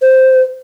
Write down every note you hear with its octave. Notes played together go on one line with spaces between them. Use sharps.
C5